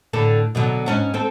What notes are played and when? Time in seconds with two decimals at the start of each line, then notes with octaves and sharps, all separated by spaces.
0.13 A2 D3 A4
0.55 B2 D3 F#3
0.86 G#2 C#4 D4
1.14 C4 A4